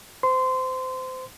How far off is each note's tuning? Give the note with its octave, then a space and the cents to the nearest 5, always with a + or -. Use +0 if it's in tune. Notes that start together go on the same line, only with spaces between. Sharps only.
C5 -25 C6 -20